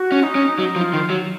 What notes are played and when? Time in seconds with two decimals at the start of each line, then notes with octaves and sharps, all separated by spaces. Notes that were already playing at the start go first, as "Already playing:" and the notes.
Already playing: F#4
0.12 C#4
0.23 D#4
0.35 C#4
0.58 F#3 D#4
0.76 F3
0.81 F4
0.93 D#3
1.10 F#3